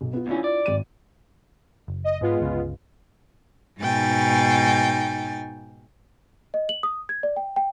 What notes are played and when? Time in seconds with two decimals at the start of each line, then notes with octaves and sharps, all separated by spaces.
0.01 B1
0.13 B3 F4
0.27 D2 C#4 D4 E4 F4
0.44 D5
0.66 G#1 D#7
1.88 F#1
2.04 D#5
2.21 G#2 G#3 B3 F4
2.40 G1 C#2 C#3
3.81 G#2 B2 D#4 G5 G#5 A6
6.54 D#5
6.69 F#7
6.83 D#6
7.09 G#6
7.23 D5
7.36 G5
7.56 G5